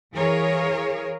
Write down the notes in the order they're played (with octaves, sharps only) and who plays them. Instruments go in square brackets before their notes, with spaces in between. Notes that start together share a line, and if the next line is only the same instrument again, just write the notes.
[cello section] E3 G#4 A#4 C#5 F5